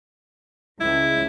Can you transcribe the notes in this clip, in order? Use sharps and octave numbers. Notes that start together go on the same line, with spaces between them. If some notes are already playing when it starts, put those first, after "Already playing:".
C#2 E4